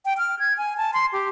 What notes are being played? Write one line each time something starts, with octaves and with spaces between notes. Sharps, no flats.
G5
F6
G#6
G#5
A5
C6
G4